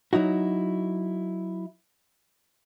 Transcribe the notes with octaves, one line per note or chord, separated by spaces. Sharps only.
F#3 D#4 E4 F#4